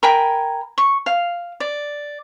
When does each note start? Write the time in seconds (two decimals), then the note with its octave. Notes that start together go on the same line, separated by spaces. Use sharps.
0.03 A#4 G5 G#5 B5
0.78 C#6
1.06 F5
1.60 D5